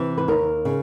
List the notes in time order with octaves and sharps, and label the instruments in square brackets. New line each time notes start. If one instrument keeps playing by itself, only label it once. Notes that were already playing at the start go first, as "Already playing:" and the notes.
Already playing: [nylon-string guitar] C3 E3
B4
D#2 A#4
C#3